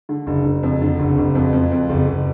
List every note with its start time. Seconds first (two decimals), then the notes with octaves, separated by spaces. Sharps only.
0.09 D3
0.27 F#1
0.45 F#1
0.63 F2
0.82 D3
0.99 F#1
1.18 F#1
1.35 F2
1.53 F2
1.72 F2
1.89 F#1
2.07 F#1